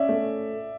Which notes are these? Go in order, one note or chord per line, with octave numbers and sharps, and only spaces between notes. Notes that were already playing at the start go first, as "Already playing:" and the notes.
Already playing: C#4 D5 E5
A3